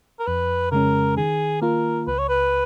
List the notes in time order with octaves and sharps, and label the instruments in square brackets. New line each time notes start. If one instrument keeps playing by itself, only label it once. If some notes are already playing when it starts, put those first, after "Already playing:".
[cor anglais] A#4
[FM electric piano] F2 [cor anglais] B4
[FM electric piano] C#3 G#3 C#4 [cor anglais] A#4
[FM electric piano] D#3 [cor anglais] G#4
[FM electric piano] A#3 F4 [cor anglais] A#4
[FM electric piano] C#2 [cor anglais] B4
[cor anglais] C#5
B4